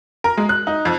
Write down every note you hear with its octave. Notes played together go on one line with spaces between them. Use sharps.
A#4
G#3
F#6
D#4
F2